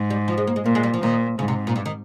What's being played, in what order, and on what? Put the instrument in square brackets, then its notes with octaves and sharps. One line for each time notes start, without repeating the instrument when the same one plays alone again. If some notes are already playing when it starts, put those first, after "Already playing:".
Already playing: [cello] G#2
[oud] G3
F3
G#3
A#3
G#3
[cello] A#2 [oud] A#3
[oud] G#3
G3
F3
[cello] A#2 [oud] D#3
[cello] G#2 [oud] C#3
[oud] C3
A#2
G2
D#3